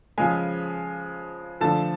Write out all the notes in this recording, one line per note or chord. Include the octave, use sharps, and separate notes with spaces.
C#3 F3 G#3 G#5
D3 F3 A3 A5